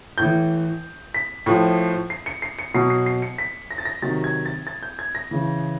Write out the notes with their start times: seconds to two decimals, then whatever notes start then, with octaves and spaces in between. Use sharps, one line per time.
0.18 A2 E3 G6
1.14 B6
1.46 A2 F3
2.10 C7
2.26 C#7
2.42 C7
2.59 C#7
2.74 B2 F#3 C7
2.90 C7
3.06 C7
3.22 C#7
3.38 B6
3.71 A#6
3.78 A6
3.85 A#6
4.02 C3 D#3 F#3 A6
4.24 G#6
4.46 A6
4.67 A6
4.83 G6
4.99 G#6
5.15 A#6
5.31 C#3 E3